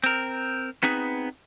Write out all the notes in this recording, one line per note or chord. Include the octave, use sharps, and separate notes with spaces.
C4 A#4
B3 C4 D#4 G#4 B4